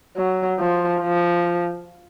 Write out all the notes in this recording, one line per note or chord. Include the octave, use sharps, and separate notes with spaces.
F#3
F3
F3